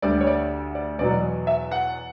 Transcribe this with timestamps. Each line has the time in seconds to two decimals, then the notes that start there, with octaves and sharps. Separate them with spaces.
0.02 D2 D3 G3 D5
0.20 C#5
0.27 D5
0.75 D5
0.99 E2 B2 F#3 D5
1.47 E5
1.71 F#5